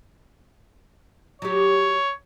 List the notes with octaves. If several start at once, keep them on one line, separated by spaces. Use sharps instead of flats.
F#3 G4 C#5